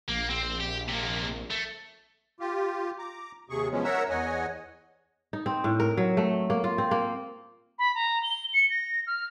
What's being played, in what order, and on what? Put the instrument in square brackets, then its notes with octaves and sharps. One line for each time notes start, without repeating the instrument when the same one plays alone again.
[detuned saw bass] A#1 [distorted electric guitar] A#3
[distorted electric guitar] C4
G4
C3 A#3
A3
[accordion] F4 G4
A#5 D6
D#2 C3 G#4 C#6
F3 F#3 G#3 B3 C#4
A#4 C#5 E5 F#5 A#5 E6
E2 C#5 D#5 F#5 G#5
[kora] D#4
C4
A2
A#4
F#3
A3
A#3
F4
C4
A#3
[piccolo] B5
A#5
G7
C#7
A#6
F6